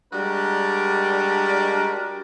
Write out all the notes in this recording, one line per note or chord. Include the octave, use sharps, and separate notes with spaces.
G3 G#3 D4 F#4 A#4 D5